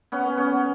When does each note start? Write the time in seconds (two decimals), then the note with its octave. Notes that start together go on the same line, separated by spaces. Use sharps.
0.12 B3 C#4
0.37 B3 C#4